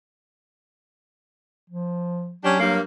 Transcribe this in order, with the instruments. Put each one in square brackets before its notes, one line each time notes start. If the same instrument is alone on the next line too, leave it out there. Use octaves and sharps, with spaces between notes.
[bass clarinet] F3
[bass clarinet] F#3 [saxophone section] C#4 D4 G4
[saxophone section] G2 A#3